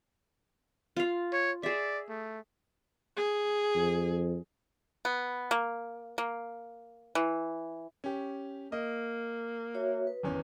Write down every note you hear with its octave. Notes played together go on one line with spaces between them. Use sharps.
F4 F5
C#5
G#4 D5 E5
A3
G#4
F2
B3
A#3
A#3
E3
C#4 G4
A#3 D#5
F#4 C#5 E5
B4
G#1 E2 C#4